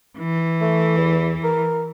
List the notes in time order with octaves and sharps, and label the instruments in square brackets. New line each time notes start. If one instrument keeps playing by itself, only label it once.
[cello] E3
[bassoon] A3
E2
A#4